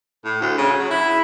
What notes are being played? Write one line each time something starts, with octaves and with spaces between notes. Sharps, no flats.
A2
D2
C#3
F#3
E4